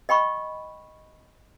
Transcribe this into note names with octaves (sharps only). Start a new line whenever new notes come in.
D#5 G5 B5 C#6